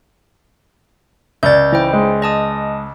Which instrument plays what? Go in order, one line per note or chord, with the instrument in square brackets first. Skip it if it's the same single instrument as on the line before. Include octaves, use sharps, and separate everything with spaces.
[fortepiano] C#2 [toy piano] D5 E6 [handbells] G6 A6
[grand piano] E3 [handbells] E4 C5 G5
[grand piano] G#3
[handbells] D#5 A5 D#6